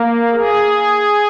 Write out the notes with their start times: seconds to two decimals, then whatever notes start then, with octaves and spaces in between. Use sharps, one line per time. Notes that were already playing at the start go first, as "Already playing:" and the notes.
Already playing: A#3
0.31 G#4